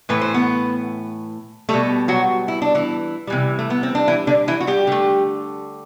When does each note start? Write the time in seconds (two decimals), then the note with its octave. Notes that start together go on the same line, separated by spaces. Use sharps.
0.09 A2 E3 A3 B4
0.21 C5
0.34 B3 B4
1.69 B2 G3 A3 A4
2.08 F#3 F#4
2.48 E4
2.62 D4
2.75 E3 E4
3.27 C3 E3 G3
3.59 A3
3.70 B3
3.83 C4
3.95 D4
4.08 E3 E4
4.27 D3 D4
4.48 E3 E4
4.60 F#4
4.67 G3 G4
4.87 D3 A3